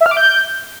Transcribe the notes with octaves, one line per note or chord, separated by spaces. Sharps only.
E5
F6
D6
G6